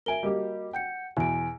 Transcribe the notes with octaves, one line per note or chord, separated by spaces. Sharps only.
A#4 E5 G#5 D7 G7
G3 A#3 F#4 G4 D#5
F#5 G5 G6 C#7
E2 B2 G#5 D7